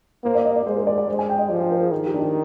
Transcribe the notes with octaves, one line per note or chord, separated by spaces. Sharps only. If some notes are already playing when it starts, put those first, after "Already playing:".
A#3 C5
D5
D#5
D5
G#3 C5
A#4
D5
D5
G#3 C5
G#5
G5
D#5
F3 D5
C5
A#4
G#4
D#3
G4
D4
D#4